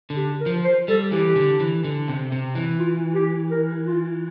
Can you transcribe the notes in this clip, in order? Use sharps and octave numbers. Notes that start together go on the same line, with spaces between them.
D3
G4
A#4
F3
C5
G3 A4
E3 G4
D3
E3
D3
C3
C3
E3
F4
G4
A#4
F4